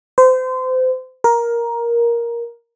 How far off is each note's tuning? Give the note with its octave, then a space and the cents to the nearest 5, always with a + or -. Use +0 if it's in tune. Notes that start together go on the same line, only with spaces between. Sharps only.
C5 -30
A#4 +10